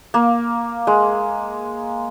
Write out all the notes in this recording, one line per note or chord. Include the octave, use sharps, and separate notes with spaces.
A#3
G#3